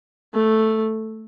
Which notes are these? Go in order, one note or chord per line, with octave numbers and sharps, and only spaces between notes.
A3